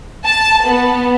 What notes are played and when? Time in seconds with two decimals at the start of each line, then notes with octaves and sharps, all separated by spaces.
0.25 A5
0.65 B3